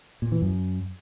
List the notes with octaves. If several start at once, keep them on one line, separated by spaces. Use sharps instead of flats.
A#2
E3
F#2